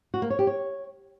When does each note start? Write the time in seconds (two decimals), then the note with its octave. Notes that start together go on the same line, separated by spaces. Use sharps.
0.14 F#4
0.22 A#3
0.30 C#5
0.39 G4
0.47 C#5